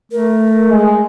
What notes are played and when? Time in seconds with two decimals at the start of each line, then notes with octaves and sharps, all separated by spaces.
0.12 A3 A#4
0.70 G#3